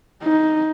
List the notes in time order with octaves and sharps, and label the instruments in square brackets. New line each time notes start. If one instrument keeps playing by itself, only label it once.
[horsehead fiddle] D#4